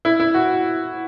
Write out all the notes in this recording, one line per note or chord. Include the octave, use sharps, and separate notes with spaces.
E4
E4
F#4